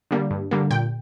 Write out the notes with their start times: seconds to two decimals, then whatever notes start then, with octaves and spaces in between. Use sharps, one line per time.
0.11 D3 G3 A#3
0.31 G2
0.51 D3 G3 A#3
0.71 A#2 G5